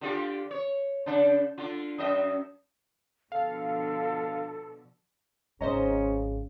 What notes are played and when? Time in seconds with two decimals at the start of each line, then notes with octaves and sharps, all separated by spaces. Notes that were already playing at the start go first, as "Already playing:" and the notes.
0.01 D3 F4 G4
0.51 C#5
1.06 C#3 D4
1.58 D3 F4
1.98 F#2 D#5 E5
3.32 B2 D3 F3 A4 F5
5.61 G#1 C#3 F3 C#4 C5 D#5 A#5